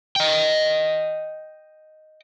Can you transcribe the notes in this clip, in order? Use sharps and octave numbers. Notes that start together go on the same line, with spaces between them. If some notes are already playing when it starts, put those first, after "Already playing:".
D#5 G5